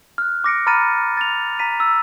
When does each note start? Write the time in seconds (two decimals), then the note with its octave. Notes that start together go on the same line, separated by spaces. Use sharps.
0.18 F6 F#6
0.44 D6 A#6 C#7 D7
0.67 A#5 B5 F6 A6 C#7 D#7
1.17 A6 F7
1.59 A#5 B6 D#7
1.80 E6